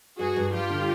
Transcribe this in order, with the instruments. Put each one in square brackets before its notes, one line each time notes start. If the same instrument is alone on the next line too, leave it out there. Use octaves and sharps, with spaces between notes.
[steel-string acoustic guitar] G2 [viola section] F#4 G#4
[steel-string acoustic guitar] G2
[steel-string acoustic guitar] G3 [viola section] F4 G4
[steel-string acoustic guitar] D3